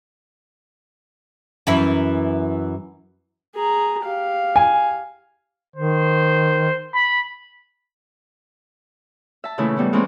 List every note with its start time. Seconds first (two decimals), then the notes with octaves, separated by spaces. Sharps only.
1.67 F#2 E3 E4
3.55 G#4 A#5
4.03 G4 F5
4.56 G#5
5.76 D#3 C5
6.95 B5
9.44 E5 A5
9.58 A#2 C#3 E3 A3 E4
9.76 E3 G3 B3 E4
9.93 E3 G#3 A#3 C4 C#4